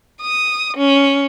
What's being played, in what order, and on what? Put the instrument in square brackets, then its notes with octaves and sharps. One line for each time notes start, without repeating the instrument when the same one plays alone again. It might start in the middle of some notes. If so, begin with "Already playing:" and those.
[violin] D#6
C#4